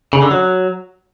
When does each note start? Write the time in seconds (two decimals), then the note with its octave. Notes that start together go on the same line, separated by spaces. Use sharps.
0.13 C#3
0.22 D3
0.31 F#3